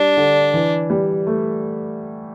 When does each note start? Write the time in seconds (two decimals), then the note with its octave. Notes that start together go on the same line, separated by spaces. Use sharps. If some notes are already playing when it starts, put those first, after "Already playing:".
Already playing: G3 D4
0.17 D3
0.54 E3
0.90 G3
1.27 A3